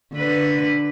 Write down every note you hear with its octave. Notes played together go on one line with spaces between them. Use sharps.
D3 B4